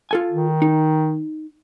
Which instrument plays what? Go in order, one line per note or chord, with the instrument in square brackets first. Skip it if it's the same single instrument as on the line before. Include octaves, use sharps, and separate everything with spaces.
[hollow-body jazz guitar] F4 A4 G#5
[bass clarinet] D#3
[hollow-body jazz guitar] D#4